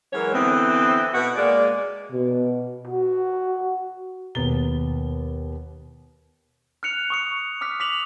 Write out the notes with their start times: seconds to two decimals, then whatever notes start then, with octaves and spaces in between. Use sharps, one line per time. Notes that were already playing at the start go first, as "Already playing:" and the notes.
0.13 E3 F#3 G#3 A#4 C#5
0.34 D3 E3 B3 C4
1.14 B2 F#4 F#5
1.36 G#3 A#3 D5
2.12 B2
2.87 F#4
4.35 D#2 B2 B3 A#5 A6 G7
6.83 F6 F#6 C#7 F7
7.10 C#6 D#6 C#7
7.61 D6 D#6 F6 B6
7.80 D6 B6 F7 F#7